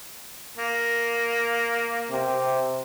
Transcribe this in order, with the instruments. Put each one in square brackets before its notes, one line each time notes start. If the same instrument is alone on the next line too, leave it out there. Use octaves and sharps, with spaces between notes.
[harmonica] A#3
[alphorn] C3